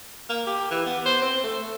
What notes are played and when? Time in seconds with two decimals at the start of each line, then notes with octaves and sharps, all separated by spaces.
0.29 A#3
0.47 G4
0.71 E3
0.86 B3
1.06 C5
1.22 C4
1.44 A3
1.62 A3